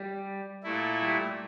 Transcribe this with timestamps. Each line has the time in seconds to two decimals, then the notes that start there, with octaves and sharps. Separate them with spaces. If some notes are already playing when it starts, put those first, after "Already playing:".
Already playing: G3
0.63 A#2 A3 E4
1.02 G3